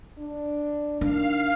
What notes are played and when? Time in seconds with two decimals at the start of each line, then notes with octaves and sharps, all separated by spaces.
0.19 D4
1.01 D#3 D4 F5